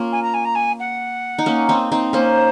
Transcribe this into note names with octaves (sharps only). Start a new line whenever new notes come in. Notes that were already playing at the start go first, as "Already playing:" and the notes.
Already playing: A#3 C#4 F4
G#5
A#5
G#5
A#5
G#5
F#5
D#4
A#3 C#4
C4 D#4
C4 D#4
A#3 C#4 C5